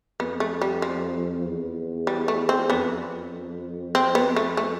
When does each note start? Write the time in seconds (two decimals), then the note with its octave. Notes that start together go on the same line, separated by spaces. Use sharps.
0.20 F2 B3
0.40 A3
0.62 G3
0.82 F3
1.45 E2
2.07 G3
2.28 A3
2.49 C4
2.70 F2 B3 D4
3.95 C4
4.15 B3
4.36 A3
4.57 A3